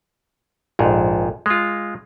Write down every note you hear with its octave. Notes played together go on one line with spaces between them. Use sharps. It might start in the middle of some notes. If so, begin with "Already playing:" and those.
A#1 F2 G#2
G#3 F4